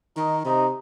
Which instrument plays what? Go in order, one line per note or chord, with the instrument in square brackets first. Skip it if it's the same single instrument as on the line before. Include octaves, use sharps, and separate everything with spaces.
[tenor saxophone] D#3 [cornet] D#4
[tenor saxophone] C3 [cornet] D#4